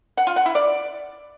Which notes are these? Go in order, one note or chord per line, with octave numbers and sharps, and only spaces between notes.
F#5
F4
F#5
E4
D5